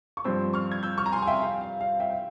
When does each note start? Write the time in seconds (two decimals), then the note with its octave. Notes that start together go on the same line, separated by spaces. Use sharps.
0.17 C#6
0.24 G2 F3 C4 C6 E6
0.53 C#6 F6
0.72 G#6
0.83 E6 G6
0.98 C#6 F6
1.06 A#5
1.12 G#5 C6
1.22 G#5
1.27 E5 G5
1.42 F5
1.61 F5
1.81 F5
2.00 E5 G5
2.10 G5